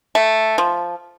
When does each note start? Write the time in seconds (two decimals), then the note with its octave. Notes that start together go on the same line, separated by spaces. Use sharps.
0.15 A3
0.58 F3